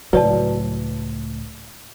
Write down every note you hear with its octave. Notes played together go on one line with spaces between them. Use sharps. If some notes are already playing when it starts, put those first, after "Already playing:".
C#2 A2 F#3 B4 D5 A5